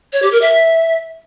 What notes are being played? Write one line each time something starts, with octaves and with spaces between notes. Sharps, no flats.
C#5
G4
A#4
E5